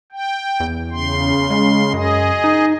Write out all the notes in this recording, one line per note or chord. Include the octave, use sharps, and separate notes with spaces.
G5
E2
C#3 C6
G#3
F#2 G#4 D#5
D#4